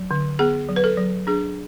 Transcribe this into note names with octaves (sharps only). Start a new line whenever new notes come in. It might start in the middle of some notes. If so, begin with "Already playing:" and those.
Already playing: F#3
D3
B3 G#4
F#3
B4
A4
F#3
D4 G#4